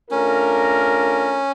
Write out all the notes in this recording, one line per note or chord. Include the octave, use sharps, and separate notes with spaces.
A3 C#4 D4 F4 A#4